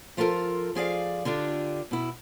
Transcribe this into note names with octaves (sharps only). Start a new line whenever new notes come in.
F3 F4 F#4 A4 A#4
F3 G#4 D5 F5
D3 D4 F4 G4
B2 E4